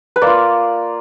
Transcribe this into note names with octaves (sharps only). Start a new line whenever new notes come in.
B4
A#3 F4 D5